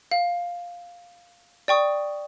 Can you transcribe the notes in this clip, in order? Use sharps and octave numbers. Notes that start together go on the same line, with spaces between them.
F5
D5 G5 C#6 D#6